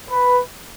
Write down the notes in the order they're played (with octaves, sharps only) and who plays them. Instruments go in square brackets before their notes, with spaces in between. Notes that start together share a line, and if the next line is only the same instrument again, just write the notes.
[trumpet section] B4